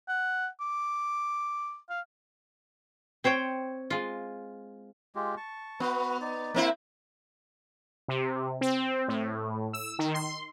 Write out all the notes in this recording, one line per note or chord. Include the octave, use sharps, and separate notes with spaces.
F#5
D6
F5
C4 C5 C#5 G5
G#3 F4
G#3 F4 G4
A5 C#6
B3 F#4 B4
D#4 D5
A#3 C4 E4
C3
C4
A2
E6
D#3
C6